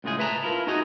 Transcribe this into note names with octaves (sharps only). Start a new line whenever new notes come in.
C#2 A2 G#3 A3 G#4
B4 E5 A5 A#5
E4 F4 A#4
D#4 F#4 G#4 D#5 A#5